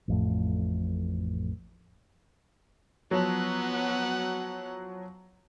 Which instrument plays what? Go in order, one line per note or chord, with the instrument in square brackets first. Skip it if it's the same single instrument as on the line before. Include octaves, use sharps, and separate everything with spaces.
[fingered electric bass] A1 F2 A2
[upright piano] F3 F#3 [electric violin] B3 F#5